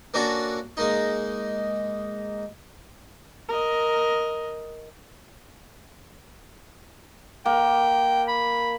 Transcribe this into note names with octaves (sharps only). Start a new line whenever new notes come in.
A#3 C#4 D4 F#4 A4
G#3 A#3 D#4
A#4 D#5
A#3 G5
B5